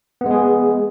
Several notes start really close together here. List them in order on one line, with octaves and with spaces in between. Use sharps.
B3 G#3 G#4